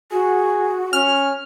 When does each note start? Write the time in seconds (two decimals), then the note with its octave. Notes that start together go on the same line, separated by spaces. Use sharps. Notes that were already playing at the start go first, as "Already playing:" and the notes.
0.12 F#4 G#4
0.93 C#4 F6